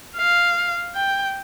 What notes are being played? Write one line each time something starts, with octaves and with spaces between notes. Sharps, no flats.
F5
G5